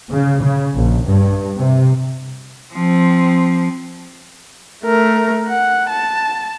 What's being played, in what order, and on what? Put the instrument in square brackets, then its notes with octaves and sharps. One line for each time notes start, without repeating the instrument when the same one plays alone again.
[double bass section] C#3
C#3
A#1
G2
C3
[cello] F3 C4
[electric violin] A3 A#4
F#5
A5